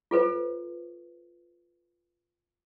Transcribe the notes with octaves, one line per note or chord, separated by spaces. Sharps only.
F4 A4 B4 C5